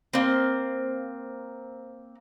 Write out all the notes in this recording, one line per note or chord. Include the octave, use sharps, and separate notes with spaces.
A#3 C4